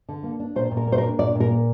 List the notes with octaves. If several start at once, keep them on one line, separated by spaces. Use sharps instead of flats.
D3
A#3
D4
A#2 C5
A#2
A#4
A#3
C5
A#4
D4
A#2 D5
A#2
A#4
A#3